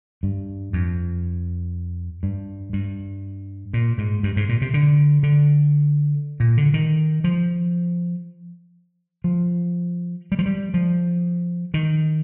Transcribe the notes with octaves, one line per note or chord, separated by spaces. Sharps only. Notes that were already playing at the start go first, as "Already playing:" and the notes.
G2
F2
G2
G2
A#2
G#2
G2
G#2
A#2
C3
D3
D3
A#2
D3
D#3
F3
F3
G3
F3
G3
F3
D#3